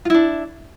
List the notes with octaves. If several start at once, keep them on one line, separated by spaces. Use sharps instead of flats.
D4 E4 F4